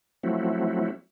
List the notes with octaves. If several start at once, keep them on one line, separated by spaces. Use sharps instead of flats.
F3 F#3 A3 C4 E4 F#4